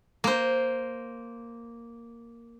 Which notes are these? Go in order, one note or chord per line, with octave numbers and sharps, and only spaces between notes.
A#3 C5